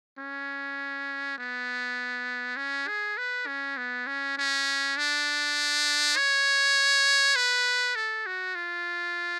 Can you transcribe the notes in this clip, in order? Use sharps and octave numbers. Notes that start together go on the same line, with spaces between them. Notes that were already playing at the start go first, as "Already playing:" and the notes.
C#4
B3
C#4
G#4
B4
C#4
B3
C#4
C#4
D4
C#5
B4
A4
F#4
F4